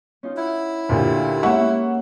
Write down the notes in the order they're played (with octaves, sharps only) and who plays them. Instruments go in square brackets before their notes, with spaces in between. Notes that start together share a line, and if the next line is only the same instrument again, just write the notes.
[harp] C#4 D#4 F4
[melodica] E4 [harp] F#5
[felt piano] D2 A#2 [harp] D#4 G4 A4
[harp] G#2 A#3 C#4 [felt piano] E5 F#5 C#6
[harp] A#3